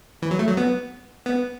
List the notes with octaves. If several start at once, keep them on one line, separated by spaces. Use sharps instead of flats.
E3
F#3
A3
F#3
B3
B3